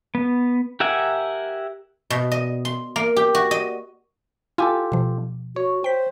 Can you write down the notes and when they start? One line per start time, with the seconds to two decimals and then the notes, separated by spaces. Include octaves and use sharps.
0.15 B3
0.80 G4 A#4 E5 F#5 G#5
2.10 B2
2.31 D#5
2.65 C6
2.96 A#3
3.16 G4
3.35 F#4
3.51 D#5
4.58 E4 F4 G4 A4 G#5
4.92 B2 F3
5.56 F#4 C#5
5.84 C5 G5 B6